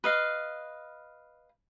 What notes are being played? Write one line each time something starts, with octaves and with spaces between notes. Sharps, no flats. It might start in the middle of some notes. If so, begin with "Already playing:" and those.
B4 D#5 F5